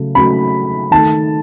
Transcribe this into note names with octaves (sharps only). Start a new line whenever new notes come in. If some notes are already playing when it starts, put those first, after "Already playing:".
Already playing: C#3 F#3 A3
C#3 F#3 A3 B5
D#3 A3 A5